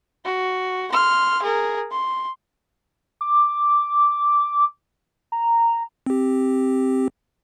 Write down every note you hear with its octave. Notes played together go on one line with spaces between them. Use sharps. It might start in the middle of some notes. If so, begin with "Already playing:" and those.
F#4
C6 F6
G#4 A#4
C6
D6
A#5
C4 G4